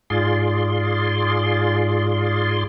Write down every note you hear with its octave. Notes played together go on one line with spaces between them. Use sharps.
G#2 F4 G#4 D5 C6